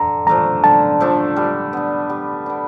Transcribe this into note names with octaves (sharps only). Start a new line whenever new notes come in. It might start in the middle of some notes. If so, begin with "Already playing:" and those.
Already playing: D3 A#5
F3 A3 D4 A#5
D3 A5
F3 A3 D4
G3
B3 D4
G3
B3 D4